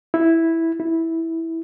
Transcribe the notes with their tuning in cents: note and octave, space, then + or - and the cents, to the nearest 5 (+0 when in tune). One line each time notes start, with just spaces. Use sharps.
E4 -5
E4 -10